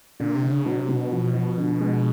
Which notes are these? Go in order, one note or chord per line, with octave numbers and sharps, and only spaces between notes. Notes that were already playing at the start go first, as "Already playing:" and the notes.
A#2 D3
C3
D3
C#3
B2 F#3
C3
B2 F#3
F3
F3
D3
G#3